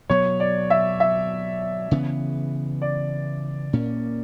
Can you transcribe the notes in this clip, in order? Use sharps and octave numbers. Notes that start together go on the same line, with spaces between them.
B2 F#3 B3 C#5
D5
E5
E5
C#3 E3 B3
D5
A#2 A#3 C#4